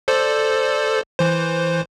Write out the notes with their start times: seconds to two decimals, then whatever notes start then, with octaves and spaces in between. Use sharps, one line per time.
0.08 A4 C5 D5
1.19 E3 C5